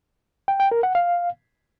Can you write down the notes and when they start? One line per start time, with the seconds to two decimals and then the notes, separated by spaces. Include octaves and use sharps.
0.48 G5
0.60 G5
0.71 A#4
0.83 F#5
0.95 F5